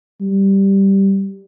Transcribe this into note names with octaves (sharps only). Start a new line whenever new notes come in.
G3